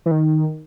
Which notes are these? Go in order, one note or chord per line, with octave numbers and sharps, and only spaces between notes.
E3
D#3